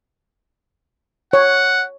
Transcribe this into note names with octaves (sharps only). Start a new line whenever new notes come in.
C#5 F#5